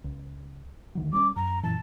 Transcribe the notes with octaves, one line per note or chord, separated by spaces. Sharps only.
C#2
D2 D#3 F#3
G3 C4 C#4 D6
F#2 A#5
F#2 A#2 E3 A5